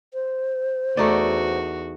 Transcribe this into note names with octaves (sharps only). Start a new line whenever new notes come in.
C5
E2 A3 D#4 F#4 D5